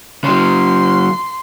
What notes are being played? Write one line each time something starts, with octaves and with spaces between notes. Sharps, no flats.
C#3 F#3 C6